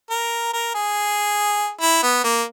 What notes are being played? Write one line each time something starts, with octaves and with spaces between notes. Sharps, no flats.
A#4
A#4
G#4
E4
B3
A#3